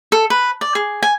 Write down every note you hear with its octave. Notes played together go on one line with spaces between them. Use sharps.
A4
B4
D5
G#4
G#5